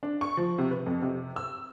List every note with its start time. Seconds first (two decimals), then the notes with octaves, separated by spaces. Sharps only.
0.03 D4
0.21 C#6
0.37 F3
0.58 C3
0.71 B4
0.86 F2
1.02 C3
1.36 E6